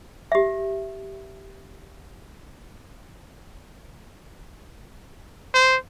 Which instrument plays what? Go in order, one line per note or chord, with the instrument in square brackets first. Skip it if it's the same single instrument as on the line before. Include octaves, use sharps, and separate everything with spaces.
[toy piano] G4 E5
[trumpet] C5